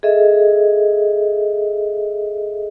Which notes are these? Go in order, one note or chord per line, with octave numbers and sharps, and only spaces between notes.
G#4 A4 D#5 E5